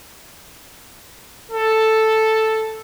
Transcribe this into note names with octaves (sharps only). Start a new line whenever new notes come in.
A4